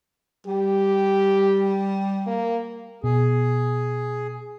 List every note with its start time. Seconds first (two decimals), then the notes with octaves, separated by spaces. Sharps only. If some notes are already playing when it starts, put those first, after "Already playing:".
0.47 G3 G4
2.27 A#3
3.04 B2 G#4